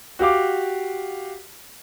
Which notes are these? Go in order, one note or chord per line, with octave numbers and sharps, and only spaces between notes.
F#4 G4 F5 D6